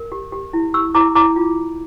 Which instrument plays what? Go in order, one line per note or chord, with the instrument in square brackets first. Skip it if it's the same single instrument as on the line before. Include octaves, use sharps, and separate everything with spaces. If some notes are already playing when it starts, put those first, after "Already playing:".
Already playing: [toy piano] A#4
G4
G4
E4
G4 C#6 E6
E4 A#5 D6
E4 A#5 D6
F4